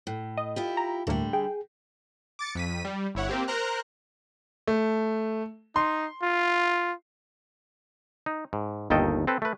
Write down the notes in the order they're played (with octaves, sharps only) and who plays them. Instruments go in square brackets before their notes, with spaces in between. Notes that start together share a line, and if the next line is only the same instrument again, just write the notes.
[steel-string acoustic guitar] A2
[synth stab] D#5
[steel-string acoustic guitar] E4 F4 G4
[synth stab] A#5
[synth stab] G1 D2 A#3 [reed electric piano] A2 A3 [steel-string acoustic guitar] D3 G3
[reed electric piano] G#4 [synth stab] G5
[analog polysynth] D6 A6 C#7
F2 B6 D#7
G3
G1 E4 C#5 F#5
A#3 C4 G4
A#4 C5 A#5 F#6
[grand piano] A3
[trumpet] D#4 [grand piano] C6
[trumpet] F4
[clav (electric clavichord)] D#4
G#2
G1 D#2 D#3 A4 D#5 G5
C4 A4 B4
A3 B4